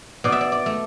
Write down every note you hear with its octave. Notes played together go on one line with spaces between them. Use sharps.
B2 D5
E5
D5
D5
A3